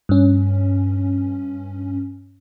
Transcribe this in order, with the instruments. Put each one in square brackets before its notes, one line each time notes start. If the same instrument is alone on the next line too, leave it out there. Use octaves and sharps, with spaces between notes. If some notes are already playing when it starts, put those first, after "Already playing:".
[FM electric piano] G2 C#4